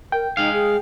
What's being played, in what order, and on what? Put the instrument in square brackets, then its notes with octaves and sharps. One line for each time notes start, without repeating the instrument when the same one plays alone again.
[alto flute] A#4 [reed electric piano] G5
[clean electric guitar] G#3 F5 [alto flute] D#4
[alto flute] G#4